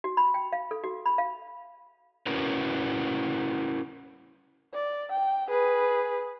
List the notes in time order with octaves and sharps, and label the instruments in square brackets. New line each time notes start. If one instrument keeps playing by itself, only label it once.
[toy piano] F#4
B5
G5
F5
A4
F#4
B5
F5
[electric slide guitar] C#4 E4 F#4 A#4 B4
[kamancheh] D5
G5
G#4 B4